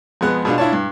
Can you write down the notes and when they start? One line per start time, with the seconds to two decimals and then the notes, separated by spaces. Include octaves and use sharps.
0.21 F2 G#3 B3 F#6
0.45 B2 G#3 B3 D4 F4
0.58 D4 E4 F4 C#5 D5 A5
0.73 G2